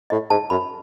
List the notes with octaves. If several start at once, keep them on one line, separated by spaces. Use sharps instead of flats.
A2 D#5
G#2 A5
F#2 B5